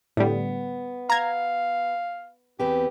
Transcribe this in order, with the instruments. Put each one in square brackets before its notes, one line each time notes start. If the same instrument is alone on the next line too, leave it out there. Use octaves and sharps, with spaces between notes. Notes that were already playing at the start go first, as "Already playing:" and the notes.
[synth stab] A2 D3 G3 [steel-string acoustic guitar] B3
[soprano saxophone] F5 [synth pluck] A#5 G#6
[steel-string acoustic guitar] E2 C4 B4 [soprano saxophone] G4